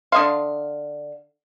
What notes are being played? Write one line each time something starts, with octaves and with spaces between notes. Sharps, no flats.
D3 E5 F5 C6 D#6